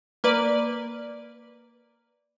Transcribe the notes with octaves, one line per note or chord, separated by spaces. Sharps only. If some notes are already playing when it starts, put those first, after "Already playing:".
A#3 B4 D5